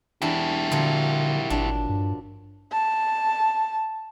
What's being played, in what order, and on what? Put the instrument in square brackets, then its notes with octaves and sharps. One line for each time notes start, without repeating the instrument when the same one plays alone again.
[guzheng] E2 D4 [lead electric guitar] E4 G4
[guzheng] A#2 F3 F#3 [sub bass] D3
[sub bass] G#1 [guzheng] D4
[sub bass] G2
[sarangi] A5